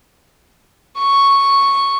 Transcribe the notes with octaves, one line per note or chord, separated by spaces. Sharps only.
C#6